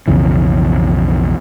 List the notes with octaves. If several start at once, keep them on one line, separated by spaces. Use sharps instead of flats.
B1 F2 C#3 E3